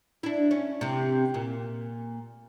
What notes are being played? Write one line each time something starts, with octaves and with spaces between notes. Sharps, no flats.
D4 E4
C#4
C3 E3
A#2